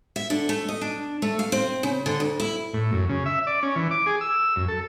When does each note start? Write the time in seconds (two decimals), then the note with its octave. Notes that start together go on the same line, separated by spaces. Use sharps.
0.16 E5
0.30 D3
0.49 A3
0.69 D#5
0.81 D4
1.22 A3
1.39 F5
1.52 C4
1.83 C#3
2.06 D3
2.20 D2
2.40 E4
2.73 A2
2.92 F#2
3.09 C#3
3.26 E5
3.47 D5
3.63 C#4
3.76 E3
3.91 D6
4.06 G#4
4.21 E6
4.56 F#2
4.68 A4